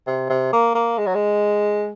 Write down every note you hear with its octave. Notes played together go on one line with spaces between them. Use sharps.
C3
C3
A#3
A#3
G#3
F#3
G#3